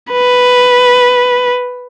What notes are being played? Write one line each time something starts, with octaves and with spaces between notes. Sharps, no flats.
B4